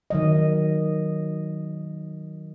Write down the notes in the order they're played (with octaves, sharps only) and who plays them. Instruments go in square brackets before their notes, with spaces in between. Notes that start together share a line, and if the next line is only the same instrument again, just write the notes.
[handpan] D#3 F#3 D#5